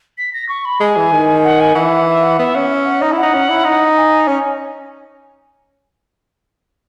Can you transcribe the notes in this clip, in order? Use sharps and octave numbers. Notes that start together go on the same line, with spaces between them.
B6
A#6
C#6
B5
G#3 G#5
E3
D#3
F#5
G#5
E3 F#5
E5
F#5
B3 E5
C#4 F#5
E5
F#5
D#4
E4 F#5
D#4
C#4
E4
D#4
G#5
C#4